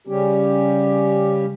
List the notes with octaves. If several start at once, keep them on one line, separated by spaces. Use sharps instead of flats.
C#3 G3 C#4 G4